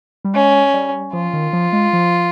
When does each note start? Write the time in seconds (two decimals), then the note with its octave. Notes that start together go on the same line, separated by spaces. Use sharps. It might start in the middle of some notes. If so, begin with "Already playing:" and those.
0.25 G3
0.34 G#3 C#4
0.74 G3
1.13 F3 F4
1.33 D#3
1.53 F3
1.73 G#3
1.93 F3